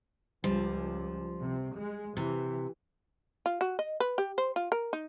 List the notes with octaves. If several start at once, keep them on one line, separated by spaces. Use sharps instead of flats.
C#2 F3 G3
C3
G#3
C3 E3
F4
F#4
D#5
B4
G4
C5
F4
A#4
D#4